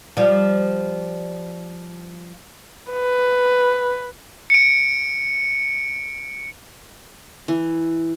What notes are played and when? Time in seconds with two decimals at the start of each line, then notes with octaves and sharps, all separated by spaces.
0.17 F3 G3
2.92 B4
4.50 C#7 D7
7.48 E3